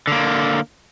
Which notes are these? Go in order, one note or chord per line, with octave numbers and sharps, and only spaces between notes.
D3 A#3